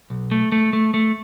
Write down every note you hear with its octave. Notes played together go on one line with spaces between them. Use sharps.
B1
A3
A3
A3
A3